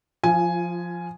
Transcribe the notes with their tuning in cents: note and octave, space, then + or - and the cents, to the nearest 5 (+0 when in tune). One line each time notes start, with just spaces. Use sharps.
F3 +5 F4 -25 G#5 +5